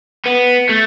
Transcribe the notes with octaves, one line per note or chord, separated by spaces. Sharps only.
B3
A3